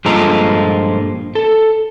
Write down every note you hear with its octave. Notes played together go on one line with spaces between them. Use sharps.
G2 A#2 F3 G#3 A4 A#5
A4